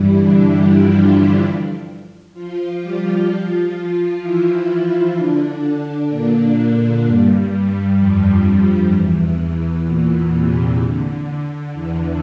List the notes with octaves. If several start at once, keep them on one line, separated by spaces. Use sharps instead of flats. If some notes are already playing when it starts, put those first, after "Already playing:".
Already playing: G2 E3 G3 E4
D3 D4
G3 G4
F3 F4
F3 F4
F3 F4
G3 G4
F3 F4
E3 E4
E3 E4
D3 D4
A#2 A#3
G2 G3
F2 F3
F2 F3
G2 G3
E2 E3
A#2
C3
D3
E2 E3